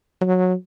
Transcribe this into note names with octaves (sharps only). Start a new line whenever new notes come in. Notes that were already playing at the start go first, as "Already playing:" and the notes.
F#3